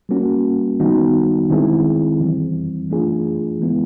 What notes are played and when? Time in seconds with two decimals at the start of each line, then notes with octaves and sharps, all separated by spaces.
0.09 G3 A#3 C#4 F#4
0.80 D#3 G3 B3 D#4 F#4
1.50 D#3 G#3 C4 E4 G#4
2.20 E3 G3 C4
2.90 E3 A3 D4 F4 G#4
3.60 E3 G#3 B3 E4